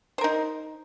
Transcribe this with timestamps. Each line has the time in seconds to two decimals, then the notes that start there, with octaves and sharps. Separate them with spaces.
0.18 C5
0.21 A#4
0.24 D#4